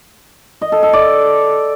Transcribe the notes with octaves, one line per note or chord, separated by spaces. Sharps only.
D#5
A4
A4
D5